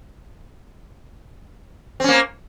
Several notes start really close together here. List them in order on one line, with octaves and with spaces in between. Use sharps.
C4 C#4 A#3